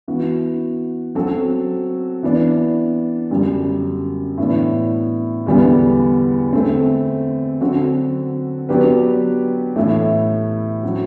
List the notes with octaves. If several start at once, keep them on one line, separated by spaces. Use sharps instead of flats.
E3 B3 F#4
F#3 C4 F#4 A4
E3 B3 D4
F#2 D3 G3
A2 E3 B3 D4
E2 D3 G3 B3
D3 A3 C4
D3 F#3 C4 F#4 A4
F#3 B3 D4 G4 B4
A2 E3 A3 E4
F#3 C4 F#4